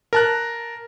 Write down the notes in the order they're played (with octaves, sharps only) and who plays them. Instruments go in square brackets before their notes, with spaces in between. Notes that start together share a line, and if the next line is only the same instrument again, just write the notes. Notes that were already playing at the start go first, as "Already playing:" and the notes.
[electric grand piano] A#4 A5 F#6